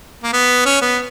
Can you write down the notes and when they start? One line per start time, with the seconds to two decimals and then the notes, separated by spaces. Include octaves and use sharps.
0.23 A#3
0.33 B3
0.65 C#4
0.82 B3